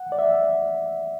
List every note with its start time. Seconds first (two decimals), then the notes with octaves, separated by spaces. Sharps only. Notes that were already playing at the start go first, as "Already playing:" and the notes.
Already playing: F#5
0.12 D5
0.19 E5